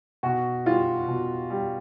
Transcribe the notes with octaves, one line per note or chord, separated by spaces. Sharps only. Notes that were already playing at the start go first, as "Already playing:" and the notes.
B2 F#4
G3 F4
B2
G3